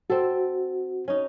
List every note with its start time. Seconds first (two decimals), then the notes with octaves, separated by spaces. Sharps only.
0.10 C4 F#4 A4
1.08 C#4 D#4